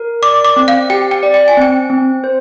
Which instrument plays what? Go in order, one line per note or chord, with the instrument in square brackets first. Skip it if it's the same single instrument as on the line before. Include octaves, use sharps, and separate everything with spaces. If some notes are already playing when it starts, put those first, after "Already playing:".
Already playing: [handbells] A#4
[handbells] D5 [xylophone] D6
[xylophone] D6
[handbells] C4
[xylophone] F5
[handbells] G4 [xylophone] G5
[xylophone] G5
[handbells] D5
[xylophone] G5
G#5
[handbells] C4 [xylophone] G5
[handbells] C4
C5